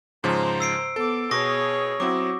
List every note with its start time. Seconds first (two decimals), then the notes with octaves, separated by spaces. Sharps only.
0.24 G#2 C#3 F3 C5 A#5
0.60 E6 C7 D7
0.96 B3 A4 D6
1.31 B2 G#4 C#5 C#6 D#6 A#6
2.00 F#3 C4 E4 F#4 D6